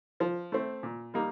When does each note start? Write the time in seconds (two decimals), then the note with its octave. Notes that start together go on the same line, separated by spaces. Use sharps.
0.20 F3
0.52 A3 C4
0.83 A#2
1.14 G3 A#3 D#4